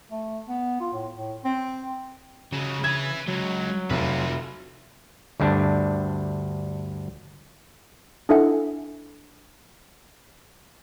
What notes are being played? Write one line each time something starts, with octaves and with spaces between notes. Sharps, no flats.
A3
B3
F4
A2
A2
C4
C#3 F#3 G#3
B4 E5 G#6
C#2 F#3
F1 F4 B4
D2 G2 G3 D4
D4 E4 A4 E5 F#5 G#5